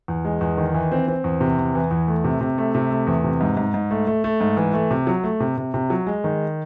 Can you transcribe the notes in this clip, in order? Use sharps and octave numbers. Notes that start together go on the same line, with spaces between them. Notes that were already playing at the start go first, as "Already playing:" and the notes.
E2
G#3
E2
D#3
E3
C4
C4
E2
C3
E2
E3
E2
A3
C3
C3
A3
C3
A3
E2
C3
G#2
G#2
G#2
A3
A3
A3
G#2
E3
A3
C3
F#3
A3
C3
C3
C3
F#3
G#3
D#3